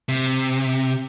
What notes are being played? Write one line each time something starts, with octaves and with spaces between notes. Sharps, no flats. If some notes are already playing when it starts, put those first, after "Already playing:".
C3